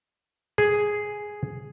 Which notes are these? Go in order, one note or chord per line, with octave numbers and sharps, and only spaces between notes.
G#4